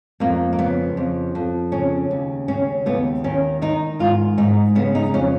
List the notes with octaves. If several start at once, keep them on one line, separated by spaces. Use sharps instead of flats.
F2 A#3
A#3
C#3 B3
F2
F2
C#3 C#4
D#2
C#3 C#4
D#2 B3
D#3 C#4
D#3 D#4
G#2 F4
G#2 D#4
C#3 B3
D#4
F2 C#4